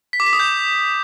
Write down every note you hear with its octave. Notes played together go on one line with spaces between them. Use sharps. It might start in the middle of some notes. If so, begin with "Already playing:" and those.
B6
D6
B6
D#6
G6